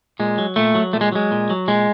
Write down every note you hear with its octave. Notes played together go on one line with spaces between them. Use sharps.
A#2 G#3
F#3
A#2 A3
F#3
A#2 A3
G#3
F#3 G#3
A#2
F#3
A#2 G#3